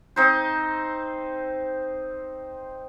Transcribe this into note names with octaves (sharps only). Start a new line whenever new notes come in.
C4 D#4 C5